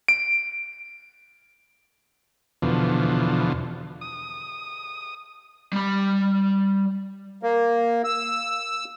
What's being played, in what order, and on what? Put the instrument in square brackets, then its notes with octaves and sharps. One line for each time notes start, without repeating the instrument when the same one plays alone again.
[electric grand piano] D7
[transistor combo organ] E2 B2 D3 F3
D#6
[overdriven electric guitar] G3 B5
[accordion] A#3
E6